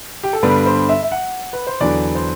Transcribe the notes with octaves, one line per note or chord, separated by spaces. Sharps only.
G4
A4
G2 D3 G3 B3 D4 B4
C5
E5
E5
F#5
B4
C5
E2 D3 F#3 B3 D4 D5
C5